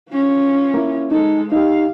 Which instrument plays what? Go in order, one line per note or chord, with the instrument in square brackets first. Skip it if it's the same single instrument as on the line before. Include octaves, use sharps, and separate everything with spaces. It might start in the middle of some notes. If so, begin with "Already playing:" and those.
[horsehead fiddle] C#4 F4
[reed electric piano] A#3 E4
[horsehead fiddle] G#3 A4 [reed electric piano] D#4
[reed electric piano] D#4 G4 [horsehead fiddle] F5